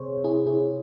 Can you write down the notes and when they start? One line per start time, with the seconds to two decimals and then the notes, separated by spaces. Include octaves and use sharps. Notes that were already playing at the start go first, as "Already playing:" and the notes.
Already playing: C3 G#4 C5 C#5
0.18 C3
0.24 E4 G#4
0.46 C3 E4 G#4